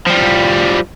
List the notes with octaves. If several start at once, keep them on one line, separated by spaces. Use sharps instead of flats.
F3 G3